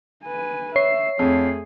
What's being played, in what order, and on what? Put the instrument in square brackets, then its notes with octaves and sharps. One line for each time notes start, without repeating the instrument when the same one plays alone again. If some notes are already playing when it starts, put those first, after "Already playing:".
[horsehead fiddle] B4 G#5
[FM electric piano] C#5 C7 [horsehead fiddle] E5
[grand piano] F2 [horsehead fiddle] A3 G#4